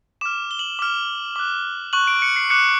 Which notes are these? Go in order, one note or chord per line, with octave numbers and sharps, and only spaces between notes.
D6 F6 E7
G7
F#7
D6 F6
D6 F#6
C#6 F#6 F#7
D7
C#7
C7
D6 F#6 C#7